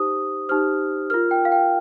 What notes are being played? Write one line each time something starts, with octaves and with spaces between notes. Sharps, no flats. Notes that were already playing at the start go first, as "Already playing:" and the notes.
Already playing: D#4 G4 C5 D#6
D#4 G4 C5 F6
F4 A#4 F6
G5
F5
G5